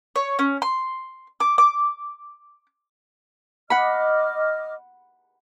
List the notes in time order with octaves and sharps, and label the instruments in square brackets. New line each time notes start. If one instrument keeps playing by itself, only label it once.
[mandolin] C#5
C#4
C6
D6
D6
[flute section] D#5 D6 F6 [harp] F#5 B5